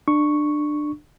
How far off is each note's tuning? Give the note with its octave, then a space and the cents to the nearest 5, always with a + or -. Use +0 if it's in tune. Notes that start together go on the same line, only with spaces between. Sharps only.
D4 +20 C#6 +0